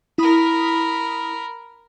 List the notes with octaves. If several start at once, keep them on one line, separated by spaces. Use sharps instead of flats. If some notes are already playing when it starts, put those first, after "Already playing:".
E4 A#4 B5 D#6